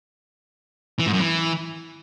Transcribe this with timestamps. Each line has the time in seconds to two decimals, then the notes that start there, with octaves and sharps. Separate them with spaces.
0.99 E3
1.06 G#2
1.13 F#2
1.20 E3